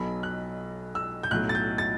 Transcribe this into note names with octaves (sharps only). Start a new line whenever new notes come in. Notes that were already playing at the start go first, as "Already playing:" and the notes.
Already playing: B1 B2 F#3 B5
F#6
E6
G6
B1 A2 F#3 F#6
A6
G6
A6